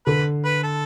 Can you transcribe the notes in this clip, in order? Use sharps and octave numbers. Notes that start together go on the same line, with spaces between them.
D3 B4
B4
A4